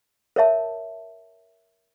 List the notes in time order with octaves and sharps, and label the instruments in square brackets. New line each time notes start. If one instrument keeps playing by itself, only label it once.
[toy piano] A#4 C#5 E5 A5